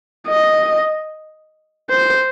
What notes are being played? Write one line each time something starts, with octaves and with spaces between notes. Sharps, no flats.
D#5
C5